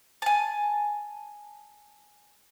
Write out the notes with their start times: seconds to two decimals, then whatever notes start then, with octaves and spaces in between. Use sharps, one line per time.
0.22 G#5 A5